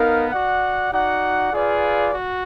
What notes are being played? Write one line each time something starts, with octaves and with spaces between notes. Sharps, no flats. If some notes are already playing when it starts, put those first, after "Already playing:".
Already playing: B3 D#4 A#4 F5
F#4 D5 F#5
D#4 F#4 D5 F#5
F4 G#4 B4 D5 F5
F#4